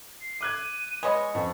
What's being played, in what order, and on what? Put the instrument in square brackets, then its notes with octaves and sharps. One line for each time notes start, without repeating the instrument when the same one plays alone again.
[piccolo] C7
[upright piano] D6 F#6 G#6 [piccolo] D#7
[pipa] G#3 B3 D#5 [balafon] B4 C#5 B5 [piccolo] C#6
[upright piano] F2 [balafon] D#5 G5